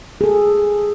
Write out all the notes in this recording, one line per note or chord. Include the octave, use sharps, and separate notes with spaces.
G#4 A4